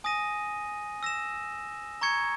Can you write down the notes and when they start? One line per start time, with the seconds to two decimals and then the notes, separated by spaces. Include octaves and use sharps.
0.04 G#5 D#6 A#6 D#7
1.03 E6 A#6 E7
2.01 A#5 C#6 G#6 C#7